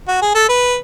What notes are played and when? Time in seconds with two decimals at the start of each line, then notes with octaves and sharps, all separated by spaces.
0.08 F#4
0.22 G#4
0.35 A4
0.49 B4